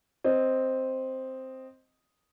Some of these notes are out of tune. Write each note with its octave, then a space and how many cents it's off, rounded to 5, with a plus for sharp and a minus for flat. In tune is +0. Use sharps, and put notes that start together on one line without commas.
C4 +0 D#5 +0